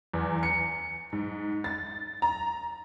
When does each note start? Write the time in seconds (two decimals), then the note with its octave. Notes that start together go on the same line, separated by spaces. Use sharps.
0.14 E2
0.43 C#7
1.12 G#2
1.64 A6
2.22 A#5